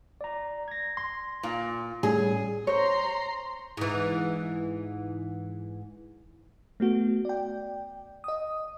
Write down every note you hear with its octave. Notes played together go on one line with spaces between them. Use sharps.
D5 A#5
G#6 A#6
C6
A#2
A2 G3 C#4 G#4
C5 C#5 A#5 C6
G#2 E3
A3 B3 F#4
D5 G5
D#5 D#6